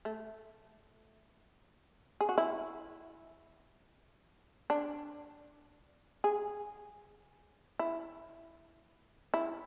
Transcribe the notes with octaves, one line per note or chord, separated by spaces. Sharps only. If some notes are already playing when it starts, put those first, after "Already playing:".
A3
G#4
F#4
E4
D4
G#4
E4
E4